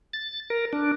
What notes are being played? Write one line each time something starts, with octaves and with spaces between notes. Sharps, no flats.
A6
A#4
D4